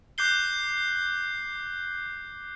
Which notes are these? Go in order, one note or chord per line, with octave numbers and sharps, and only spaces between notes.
D6 F#6 G6 C7 G7